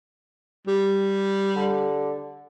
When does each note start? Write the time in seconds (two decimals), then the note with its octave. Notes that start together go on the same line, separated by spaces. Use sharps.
0.67 G3 G4
1.56 D3